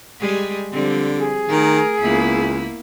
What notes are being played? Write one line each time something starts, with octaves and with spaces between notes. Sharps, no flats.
G3 G#3 G#4
D3 F3 G3 C4
G#4
D#3 A3 A#4
C#2 A#3 B3 E4